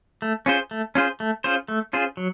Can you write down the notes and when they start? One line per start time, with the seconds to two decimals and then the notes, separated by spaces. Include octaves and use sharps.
0.22 A3
0.46 C#4 F4 G#4 C5
0.71 A3
0.95 C#4 F4 G#4 C5
1.20 A3
1.44 C#4 F4 G#4 C5
1.68 A3
1.93 C#4 F4 G#4 C5
2.17 F#3